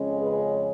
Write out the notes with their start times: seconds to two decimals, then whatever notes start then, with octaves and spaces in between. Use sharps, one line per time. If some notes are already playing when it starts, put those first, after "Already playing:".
Already playing: F2 C#3 G#3 C#4
0.18 G#4 B4